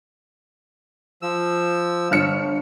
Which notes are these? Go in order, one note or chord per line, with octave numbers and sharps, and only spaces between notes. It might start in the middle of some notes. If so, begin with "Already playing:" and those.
F3 E6
G1 F6 C#7